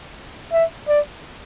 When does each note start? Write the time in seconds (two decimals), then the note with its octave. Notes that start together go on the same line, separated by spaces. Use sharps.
0.53 E5
0.89 D5